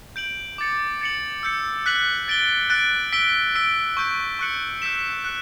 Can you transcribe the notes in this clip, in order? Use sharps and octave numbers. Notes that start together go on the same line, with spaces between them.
G6 D7 F#7
D6 A6 C#7
A6 C#7 F#7
E6 G6 C#7
F#6 B6 F#7
A6 D7 G7
F#6 A6 D7
E6 B6 D7 G7
E6 B6 D7 G7
C#6 G6 D7
C#6 F#6 C#7 F#7
E6 G6 B6 E7
F#6 C#7